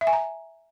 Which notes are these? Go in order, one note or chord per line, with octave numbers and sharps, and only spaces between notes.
E5
G#5
A#5